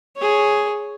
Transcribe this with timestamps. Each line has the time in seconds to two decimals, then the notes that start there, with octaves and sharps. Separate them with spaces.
0.17 G#4 C#5